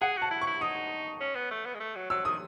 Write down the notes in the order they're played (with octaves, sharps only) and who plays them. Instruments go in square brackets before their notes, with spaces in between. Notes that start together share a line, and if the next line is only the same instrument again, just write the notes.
[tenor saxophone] G#4 [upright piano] F#5
[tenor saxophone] F#4 [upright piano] A5
[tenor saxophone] E4
[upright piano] C#6
[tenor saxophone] E4
[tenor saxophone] D#4 [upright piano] D#6
[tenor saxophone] C#4
B3
A3
B3
G#3
A3
F#3
[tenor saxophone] F#3 [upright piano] E6
[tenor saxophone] D#3 [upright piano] D#6